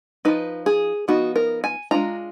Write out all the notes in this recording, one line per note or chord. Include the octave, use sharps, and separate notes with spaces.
F3 G#3 D#4 B4
G#4
F3 B3 D#4 F#4
A#4
G#5
G#3 D4 F4 A#5